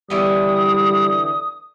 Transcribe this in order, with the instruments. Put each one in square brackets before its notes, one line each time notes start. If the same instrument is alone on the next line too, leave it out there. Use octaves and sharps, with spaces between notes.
[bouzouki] D3 E3 B3 [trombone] G3 [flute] D#6